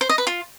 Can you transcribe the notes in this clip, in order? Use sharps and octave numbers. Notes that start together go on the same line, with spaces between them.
C5
D#5
B4
F4